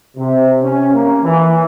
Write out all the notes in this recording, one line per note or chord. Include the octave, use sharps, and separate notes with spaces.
C3
C#4
A#3
E3